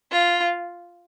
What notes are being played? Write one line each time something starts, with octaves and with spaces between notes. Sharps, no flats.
F4